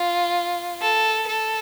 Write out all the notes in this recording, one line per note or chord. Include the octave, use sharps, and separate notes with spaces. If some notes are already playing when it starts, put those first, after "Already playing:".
Already playing: F4
A4
A4